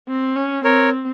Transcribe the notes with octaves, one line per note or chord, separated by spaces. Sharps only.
C4
C#4
C4 A#4 C#5